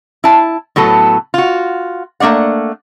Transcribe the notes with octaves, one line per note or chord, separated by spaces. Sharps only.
E4 A5
A2 F#3 B3 A4
F4 F#4
A3 A#3 D4 D5 F#5